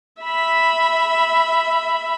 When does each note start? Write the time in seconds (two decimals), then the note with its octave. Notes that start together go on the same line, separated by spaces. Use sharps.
0.22 E5 B5